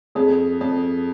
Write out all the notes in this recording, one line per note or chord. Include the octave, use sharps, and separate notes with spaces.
F2 G#4
F2